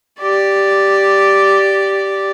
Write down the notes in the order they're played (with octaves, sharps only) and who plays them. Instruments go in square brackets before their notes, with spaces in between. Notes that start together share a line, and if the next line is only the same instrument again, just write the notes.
[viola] G4 D5